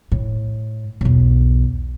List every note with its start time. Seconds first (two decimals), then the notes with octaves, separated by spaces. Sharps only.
0.12 A2
1.01 B1 E2